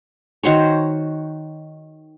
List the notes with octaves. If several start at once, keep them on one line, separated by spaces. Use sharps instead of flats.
D#3 F#4 C5 C#5